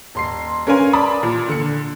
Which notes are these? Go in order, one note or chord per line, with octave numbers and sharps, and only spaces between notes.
D#1 C6 C7
C#4 A#4 B4 F5 G#5 C6
D5 A5 B5 C6 D6 D#6
A#2
D3 C#7